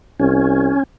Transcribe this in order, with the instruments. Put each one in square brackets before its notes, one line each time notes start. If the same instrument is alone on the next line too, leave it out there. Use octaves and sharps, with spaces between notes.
[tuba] C2 [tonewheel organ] C#4